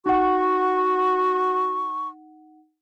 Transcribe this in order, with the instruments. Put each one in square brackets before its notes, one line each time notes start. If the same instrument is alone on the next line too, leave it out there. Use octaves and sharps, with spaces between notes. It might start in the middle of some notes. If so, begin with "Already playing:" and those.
[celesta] D#4 F#5 [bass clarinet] F#4 [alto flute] C#6